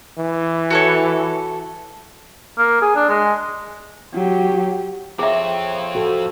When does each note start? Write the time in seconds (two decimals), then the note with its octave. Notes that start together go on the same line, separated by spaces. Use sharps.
0.19 E3
0.70 F#4 A4 C#5
2.58 A#3
2.82 G#4
2.95 D4
3.09 G#3
4.13 F#3 G4
5.19 F2 C4 G#4 C#5 E5 G5
5.95 F#4 A4